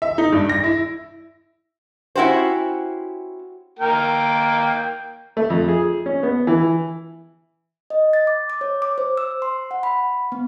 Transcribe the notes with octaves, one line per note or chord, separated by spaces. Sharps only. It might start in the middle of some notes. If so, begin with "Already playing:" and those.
E5
D#4
G2
A#6
E4
C#4 E4 F#4 G4 C5
A#3 A#4 G5
A3
F2
G#4
C#4
B3
E3
D#5
A6
D6
D6
C#5
D6
C5
E6
C6
F#5
B5
B3